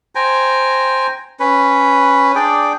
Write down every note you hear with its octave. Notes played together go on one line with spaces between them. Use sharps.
C5 G5 G#5 A#5
C#4 B4
D4 G#4 D5 G5